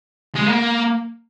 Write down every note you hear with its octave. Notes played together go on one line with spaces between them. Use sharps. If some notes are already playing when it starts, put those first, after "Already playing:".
G#3
A#3